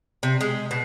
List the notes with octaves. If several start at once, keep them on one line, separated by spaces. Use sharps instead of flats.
C3
G#3
B2